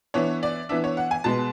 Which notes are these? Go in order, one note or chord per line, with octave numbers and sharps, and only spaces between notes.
E3 B3 D4 C#5
D5
E3 B3 D4 E5
C#5
F#5
G#5
B2 G#3 B3 A5